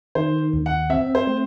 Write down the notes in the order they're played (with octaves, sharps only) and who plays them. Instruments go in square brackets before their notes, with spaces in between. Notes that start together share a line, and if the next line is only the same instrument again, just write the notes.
[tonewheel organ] D#3 [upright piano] C5
[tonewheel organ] D#2
[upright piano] F#5
[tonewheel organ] C4 [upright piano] E5
[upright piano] C5
[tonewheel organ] A3